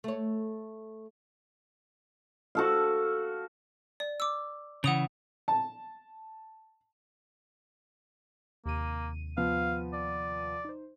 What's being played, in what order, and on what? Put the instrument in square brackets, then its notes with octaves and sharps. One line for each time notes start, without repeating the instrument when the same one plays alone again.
[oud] A3 C#5
[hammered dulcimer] F#4 A4 F5
[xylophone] D5
D6 E6
[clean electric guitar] C#3 E3 [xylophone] F#5 D#6 F7
[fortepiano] A5
[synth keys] D#2 C3 D#7 [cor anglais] A#3
[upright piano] F3 B3 [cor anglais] F5
[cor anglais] D5
[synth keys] D#4 C5